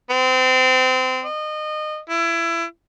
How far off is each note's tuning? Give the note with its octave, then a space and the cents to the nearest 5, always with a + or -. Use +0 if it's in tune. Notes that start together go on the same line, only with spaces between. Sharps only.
C4 -25
D#5 -25
E4 +25